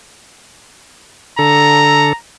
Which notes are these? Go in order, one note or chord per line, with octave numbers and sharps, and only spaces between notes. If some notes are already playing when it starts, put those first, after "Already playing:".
D3 A4 A#5